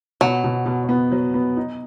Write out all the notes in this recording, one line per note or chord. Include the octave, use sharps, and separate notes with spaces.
B2 F#3
B2
B2
B3
F#3
B3
D#4